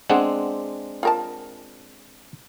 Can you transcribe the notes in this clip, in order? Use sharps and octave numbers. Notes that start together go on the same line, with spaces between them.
G#3 B3 C4 D4 G#4 F#5
F4 A#4 A5